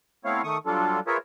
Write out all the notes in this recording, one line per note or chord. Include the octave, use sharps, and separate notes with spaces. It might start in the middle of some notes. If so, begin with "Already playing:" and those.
A3 B3 C4 E4 C#5 F5
D#3 A3 C#6 D#6
F#3 G3 D4 F4 A4
F4 G#4 A#4 B4 C#5 E5